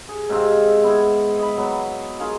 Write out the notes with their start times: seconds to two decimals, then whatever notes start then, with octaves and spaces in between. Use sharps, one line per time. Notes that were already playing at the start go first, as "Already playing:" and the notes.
0.09 G#4
0.29 G#2 C3 C4 F5
0.83 B3 E4 E5
1.39 D#5 B5
1.57 F#3 B3
2.20 F4 G#4 A#4 F5